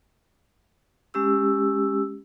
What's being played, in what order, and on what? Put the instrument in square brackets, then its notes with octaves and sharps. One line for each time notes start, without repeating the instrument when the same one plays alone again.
[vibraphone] G#3 C#4 G4 E6